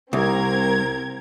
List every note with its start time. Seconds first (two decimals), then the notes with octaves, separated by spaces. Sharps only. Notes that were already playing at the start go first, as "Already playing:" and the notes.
0.13 C2 C4 A#4 G#6